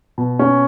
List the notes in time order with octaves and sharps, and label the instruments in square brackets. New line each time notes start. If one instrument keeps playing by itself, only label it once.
[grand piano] B2
C#4